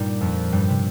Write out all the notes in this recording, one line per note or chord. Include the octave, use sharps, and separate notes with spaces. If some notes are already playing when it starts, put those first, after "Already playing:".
Already playing: G2 A#2 G3 A#3 D#4
F2 F3
G2 G3
C3